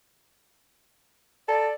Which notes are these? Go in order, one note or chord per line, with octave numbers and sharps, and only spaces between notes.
A4 D5